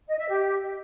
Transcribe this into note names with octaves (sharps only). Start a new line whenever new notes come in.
D#5
E5
G4